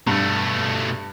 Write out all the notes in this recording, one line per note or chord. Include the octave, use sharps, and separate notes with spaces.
G2 B2 A3